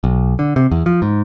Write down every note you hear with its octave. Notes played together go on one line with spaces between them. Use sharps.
B1
D3
C3
E2
F3
G#2